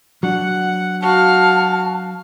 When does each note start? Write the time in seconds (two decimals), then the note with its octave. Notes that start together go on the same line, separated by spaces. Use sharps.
0.23 F#3 D4 F#5
1.02 F#4 F5 A5